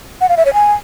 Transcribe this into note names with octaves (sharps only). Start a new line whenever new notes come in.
F#5
F5
E5
C#5
G#5